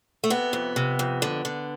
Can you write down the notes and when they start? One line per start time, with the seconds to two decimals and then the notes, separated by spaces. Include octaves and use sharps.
0.24 A3
0.30 C3 B3
0.53 F2
0.76 C3
0.99 F2
1.22 D3
1.45 D3